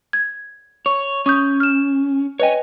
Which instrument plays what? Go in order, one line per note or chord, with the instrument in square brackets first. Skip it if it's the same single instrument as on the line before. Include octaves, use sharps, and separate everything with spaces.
[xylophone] G#6
[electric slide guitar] C#5 [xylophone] C#6
[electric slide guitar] C#4 [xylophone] C#6 D#6 G6
[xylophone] F6 E7
[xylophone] B4 D#5 G5 [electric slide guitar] C#5 G#5